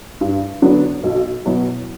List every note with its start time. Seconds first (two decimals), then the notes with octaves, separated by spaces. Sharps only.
0.21 G2
0.62 D3 F#3 B3 D4
1.03 B1
1.45 B2 F#3 B3 E4